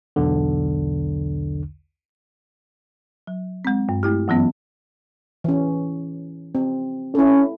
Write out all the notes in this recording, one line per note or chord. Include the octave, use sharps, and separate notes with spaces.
B1 E2 D3
F#3
G#3 C4
G2
A3 E4 G4
F#2 E3 F#3 B3 C#4
E3 C#4
C4
C#4 E4 A4